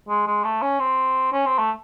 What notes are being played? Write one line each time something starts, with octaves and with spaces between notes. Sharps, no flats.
G#3
G#3
A3
C#4
C4
C#4
C4
A3